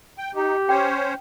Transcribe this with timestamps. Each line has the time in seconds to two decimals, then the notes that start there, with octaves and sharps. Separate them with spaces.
0.18 G5
0.35 D#4 G4
0.69 C#4 C5 C#5 G5